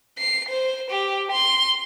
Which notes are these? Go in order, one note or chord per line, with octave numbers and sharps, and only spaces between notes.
C7
C5
G4
C6